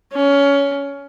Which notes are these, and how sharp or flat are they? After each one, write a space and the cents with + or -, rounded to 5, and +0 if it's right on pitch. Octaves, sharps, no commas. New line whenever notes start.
C#4 +20